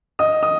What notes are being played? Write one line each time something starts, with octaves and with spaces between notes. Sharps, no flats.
D#5 D#6
D#6